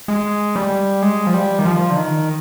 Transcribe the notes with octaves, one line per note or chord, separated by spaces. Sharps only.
G#3
G3
G#3
F3
G3
D#3
F3
D3
D#3